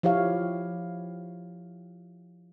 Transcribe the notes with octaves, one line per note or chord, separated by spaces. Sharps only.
F3 E4 G4 C#5 F5